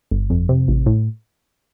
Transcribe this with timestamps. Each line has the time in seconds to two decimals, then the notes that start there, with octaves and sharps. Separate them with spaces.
0.11 G1
0.30 F2
0.49 C3
0.68 A1
0.86 A2